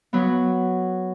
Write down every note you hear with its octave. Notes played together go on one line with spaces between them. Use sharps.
F#3 B3